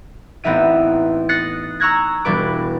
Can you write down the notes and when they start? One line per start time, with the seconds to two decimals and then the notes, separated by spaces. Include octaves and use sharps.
0.44 A1 B3 C4 D#4 E5 D#7
1.29 D#6 F#6 A6 A#6 C7 C#7
1.80 A#5 C#6 E6 F#6 G#6 A#6
2.25 E1 G3 D4 B4 D6